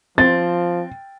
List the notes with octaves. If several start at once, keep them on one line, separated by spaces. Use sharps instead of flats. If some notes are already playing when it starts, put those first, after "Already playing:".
F3 C4 A6